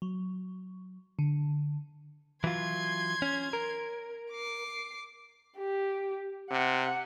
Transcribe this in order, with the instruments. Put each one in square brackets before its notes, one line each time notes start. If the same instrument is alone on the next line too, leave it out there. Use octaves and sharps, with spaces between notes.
[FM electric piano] F#3
D3
[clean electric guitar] E3 F#3 F4 [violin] C6 G#6
[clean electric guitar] C#4
A#4
[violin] D6 C7
[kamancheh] G4
[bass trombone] C3 [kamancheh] F#5